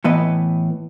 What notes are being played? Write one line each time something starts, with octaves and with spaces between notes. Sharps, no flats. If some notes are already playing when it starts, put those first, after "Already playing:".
A2 E3 B3 B4 D#5